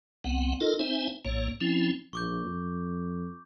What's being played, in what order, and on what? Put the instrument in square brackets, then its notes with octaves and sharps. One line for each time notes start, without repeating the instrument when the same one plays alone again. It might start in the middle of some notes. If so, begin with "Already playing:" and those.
[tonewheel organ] C2 B3 C4 F#5
D#4 F4 A4 A#4 D#5
C4 D#4 C5 E5 G#5
A#1 A2 A#3 C#5
F3 C4 C#4 E4
[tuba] A#1 [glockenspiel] C#6 D6 G6
[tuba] F2